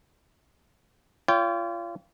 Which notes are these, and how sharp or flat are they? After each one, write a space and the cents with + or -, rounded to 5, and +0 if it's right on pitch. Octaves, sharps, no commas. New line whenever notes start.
F4 -30 C#5 +45 G5 +0